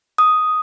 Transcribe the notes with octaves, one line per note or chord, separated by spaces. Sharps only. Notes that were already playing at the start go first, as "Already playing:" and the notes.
D#6